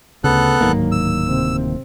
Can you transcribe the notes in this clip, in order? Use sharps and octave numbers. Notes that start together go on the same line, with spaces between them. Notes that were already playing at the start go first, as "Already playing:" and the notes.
D2 C#3 B3 A4 F#6
D1 G#2 D#3 F#3 A#3
E6
C3 C4